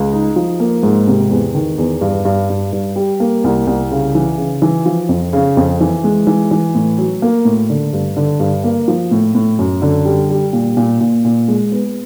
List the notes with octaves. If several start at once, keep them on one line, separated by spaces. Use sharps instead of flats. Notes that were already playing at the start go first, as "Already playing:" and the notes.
Already playing: C#2
D#4
F3
A#3
G#2
C3
E2
D#3
E2
G2
G2
G2
G2
G3
A#3
C2
C2
C#3
E3
C#3
E3
F3
F2
C#3
F2
E3
G#3
E3
E3
A2
F#3
A#3
A2
D3
G2
D3
G2
A#3
F3
A2
A2
F#2
D3
G3
G3
A#2
A#2
A#2
A#2
G#3
B3